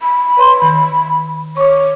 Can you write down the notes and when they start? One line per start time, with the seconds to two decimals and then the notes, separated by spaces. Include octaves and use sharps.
0.02 B5
0.37 B4 C#5 C6
0.62 D#3
1.57 C#5 C#6 D6